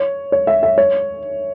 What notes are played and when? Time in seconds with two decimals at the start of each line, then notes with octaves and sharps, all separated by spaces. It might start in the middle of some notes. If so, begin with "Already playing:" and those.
Already playing: C#5
0.32 C#5
0.47 E5
0.63 E5
0.78 C#5